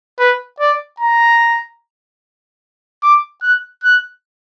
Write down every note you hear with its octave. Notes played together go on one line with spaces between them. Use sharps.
B4
D5
A#5
D6
F#6
F#6